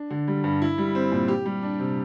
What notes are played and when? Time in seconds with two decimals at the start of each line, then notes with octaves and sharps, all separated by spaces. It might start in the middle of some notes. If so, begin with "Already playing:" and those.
Already playing: D4
0.10 D3
0.28 G3
0.44 G2
0.62 E4
0.78 G3
0.95 C4
1.12 A#2
1.28 G4
1.46 G3
1.63 D4
1.79 C3